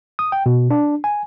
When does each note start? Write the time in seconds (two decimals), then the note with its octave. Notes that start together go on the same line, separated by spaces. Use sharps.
0.19 D#6
0.32 G5
0.46 B2
0.71 D4
1.04 G#5